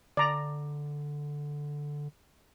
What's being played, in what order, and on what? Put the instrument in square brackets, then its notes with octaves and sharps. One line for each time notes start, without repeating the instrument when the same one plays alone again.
[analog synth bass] D3 [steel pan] D5 A#5